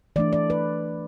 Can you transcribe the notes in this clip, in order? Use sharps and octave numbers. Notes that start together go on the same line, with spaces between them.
E3 A3 D4 D5
D5
B4